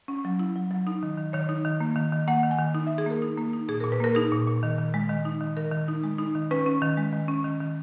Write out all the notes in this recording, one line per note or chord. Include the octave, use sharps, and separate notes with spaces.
C#4
F#3
E4
F#3
F#3
D#4
D#3
D#3
D#3 C#5
D#4
D#3
A#3
D#3
D#3
A#3 F#5
D#3
G#5
D#3
D#4
E5
D#4
G#4
A#3 A#4
D#4
A#3
D#4
A#2 G#4
A#4
A#2
B4
A#3 A#4
D#4 G#4
A#2
A#2
D#3
D#3
G#3
D#3
D#4
D#3
D#3 A#4
D#3
D#4
G#3
D#4
D#3
C#4 B4
C#4
D#3
G#3
D#3
C#4
D#3
D#3